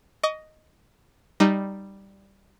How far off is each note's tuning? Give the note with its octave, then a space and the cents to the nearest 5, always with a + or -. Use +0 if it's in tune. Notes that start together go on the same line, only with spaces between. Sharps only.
D#5 +0 C#6 +40
G3 +0 D#4 -10